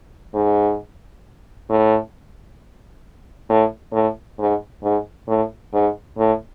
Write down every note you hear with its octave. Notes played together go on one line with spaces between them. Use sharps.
G#2
A2
A2
A2
G#2
G#2
A2
G#2
A2